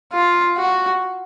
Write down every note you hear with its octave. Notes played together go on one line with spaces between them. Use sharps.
F4
F#4